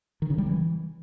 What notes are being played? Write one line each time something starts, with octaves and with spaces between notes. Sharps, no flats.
D#3
C#3
G3
E3